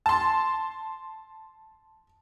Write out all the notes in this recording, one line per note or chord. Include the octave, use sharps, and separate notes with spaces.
A5 C6